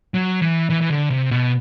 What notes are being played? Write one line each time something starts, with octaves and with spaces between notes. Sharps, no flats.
F#3
E3
E3
E3
D3
C3
B2